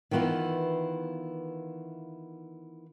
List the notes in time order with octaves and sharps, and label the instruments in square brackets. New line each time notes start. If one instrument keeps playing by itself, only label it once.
[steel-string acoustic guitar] D#3 E3 B3 E4 F4